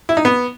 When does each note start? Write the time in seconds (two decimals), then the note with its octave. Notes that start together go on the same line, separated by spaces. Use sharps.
0.09 E4
0.17 D#4
0.25 B3